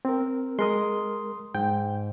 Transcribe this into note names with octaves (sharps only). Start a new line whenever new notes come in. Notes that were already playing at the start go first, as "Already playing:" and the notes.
C4 A#4
G#3 A#4 C6 D#6
G#2 G5